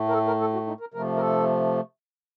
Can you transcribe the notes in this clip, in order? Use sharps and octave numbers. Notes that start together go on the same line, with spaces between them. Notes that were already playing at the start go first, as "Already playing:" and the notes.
Already playing: A2 A3
A#4
A4
A#4
A4
F#4
D#4
A#4
C3 F3 A3 A#4
A#4
A4